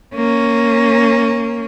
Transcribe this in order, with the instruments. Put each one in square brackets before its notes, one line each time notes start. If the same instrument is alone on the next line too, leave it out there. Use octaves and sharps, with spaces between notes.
[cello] A#3 C#4